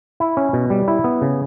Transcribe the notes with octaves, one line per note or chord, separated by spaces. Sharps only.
E4
C#4
B2
G3
E4
B3
C#3